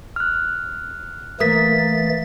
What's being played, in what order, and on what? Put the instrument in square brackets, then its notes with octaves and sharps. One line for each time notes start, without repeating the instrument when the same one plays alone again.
[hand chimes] F6 F#6
[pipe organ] E3 A3 A6 [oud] A#3 [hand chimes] D#6 B6